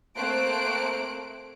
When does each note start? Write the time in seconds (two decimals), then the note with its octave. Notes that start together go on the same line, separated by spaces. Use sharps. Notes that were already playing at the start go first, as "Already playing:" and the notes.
0.16 A3 A#3 C4 C5 F#6 D7